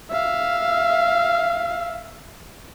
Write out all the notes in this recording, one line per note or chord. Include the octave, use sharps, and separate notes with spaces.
E5 F5